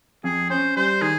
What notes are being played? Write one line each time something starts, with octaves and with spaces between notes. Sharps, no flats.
F2 G#4
C#4 C5
G3 C5
D#3 G#4